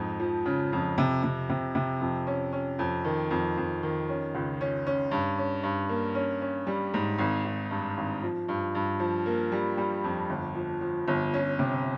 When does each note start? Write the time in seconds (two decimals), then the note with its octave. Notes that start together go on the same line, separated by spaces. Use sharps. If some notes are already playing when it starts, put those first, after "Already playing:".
Already playing: F2 G#2
0.20 F3
0.45 C#3
0.73 F2
0.98 C3
1.23 C3
1.49 C3
1.75 C3
2.01 F2
2.27 C#4
2.53 C#4
2.79 F2
3.05 D#3
3.31 F2
3.57 F2
3.83 D#3
4.09 C#4
4.34 C#2
4.61 C#4
4.87 C#4
5.11 G2
5.38 C#4
5.63 G2
5.89 A#3
6.15 C#4
6.42 C#4
6.67 G3
6.94 G#2
7.18 G#1
7.44 G#1
7.71 G2
7.97 G#1
8.22 F3
8.48 G2
8.75 G2
9.00 F3
9.26 A#3
9.52 G3
9.77 G3
10.04 F2
10.30 G1
10.55 F3
10.81 F3
11.08 G1
11.34 C#4
11.59 C3